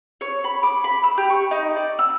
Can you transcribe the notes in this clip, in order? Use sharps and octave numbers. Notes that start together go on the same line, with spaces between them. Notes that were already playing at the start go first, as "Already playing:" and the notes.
C#5
B5
D6
B5
E6
G4
C#6
D#4
D5
E6